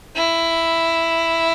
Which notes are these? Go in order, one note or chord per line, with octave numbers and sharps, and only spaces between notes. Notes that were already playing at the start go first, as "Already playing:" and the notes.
E4